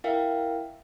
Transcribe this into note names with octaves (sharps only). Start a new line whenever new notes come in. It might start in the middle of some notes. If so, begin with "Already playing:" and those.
E4 A#4 E5 F5 G5